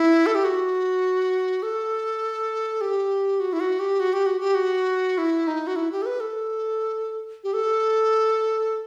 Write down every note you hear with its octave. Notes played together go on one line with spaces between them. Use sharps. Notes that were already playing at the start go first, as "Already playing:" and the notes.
Already playing: E4
A4
G4
F#4
A4
G4
F#4
E4
F#4
G4
F#4
G4
F#4
G4
F#4
E4
D#4
F#4
E4
G4
A4
B4
A4
G4
A4